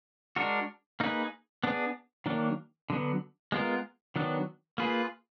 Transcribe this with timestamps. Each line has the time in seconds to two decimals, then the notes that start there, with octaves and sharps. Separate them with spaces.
0.36 G#3 D4 F#4 A#4
1.00 A#3 D#4 G#4 B4
1.64 B3 D4 G#4
2.26 D#3 F#3 A#3 D4
2.90 D3 F#3 B3
3.52 G#3 B3 F4 A#4
4.16 D#3 F#3 B3 D4
4.78 A#3 F4 G#4 B4